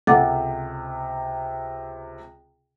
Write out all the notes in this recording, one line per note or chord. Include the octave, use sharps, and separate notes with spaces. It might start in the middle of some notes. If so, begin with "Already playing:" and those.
C#2 C3 A4 F#5 D6